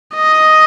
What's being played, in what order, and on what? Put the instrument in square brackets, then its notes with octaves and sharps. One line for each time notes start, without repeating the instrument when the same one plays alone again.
[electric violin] D#5